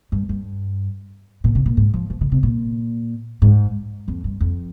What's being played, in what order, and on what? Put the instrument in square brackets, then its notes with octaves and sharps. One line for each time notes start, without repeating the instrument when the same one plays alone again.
[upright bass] G2
G2
A#2
C3
A#2
G#2
F3
F3
D3
C3
A#2
G#2
F2
G2
F2